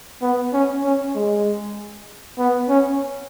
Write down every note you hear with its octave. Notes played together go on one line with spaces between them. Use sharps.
B3
C#4
C#4
G#3
B3
C#4